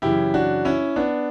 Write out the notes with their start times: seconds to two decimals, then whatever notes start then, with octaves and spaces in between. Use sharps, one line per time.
0.02 F#2 C#3 E3 E4 G4
0.34 D4 F#4
0.65 C#4 E4
0.96 B3 D4